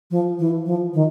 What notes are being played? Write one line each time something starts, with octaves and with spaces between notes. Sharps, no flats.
F3
E3
F3
D#3